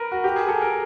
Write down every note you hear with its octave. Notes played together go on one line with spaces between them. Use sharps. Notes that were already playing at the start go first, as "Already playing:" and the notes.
Already playing: A#4 B4
F#4
G4
G#4
A4
A#4